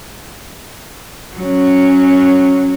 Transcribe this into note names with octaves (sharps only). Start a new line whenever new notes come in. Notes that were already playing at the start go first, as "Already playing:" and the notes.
F#3 C#4